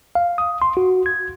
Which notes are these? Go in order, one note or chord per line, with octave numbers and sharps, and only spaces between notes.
F5
D#6
C6
F#4
G#6